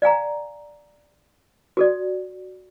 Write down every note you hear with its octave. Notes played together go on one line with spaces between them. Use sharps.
D5 F5 G#5 A#5
F#4 A4 D5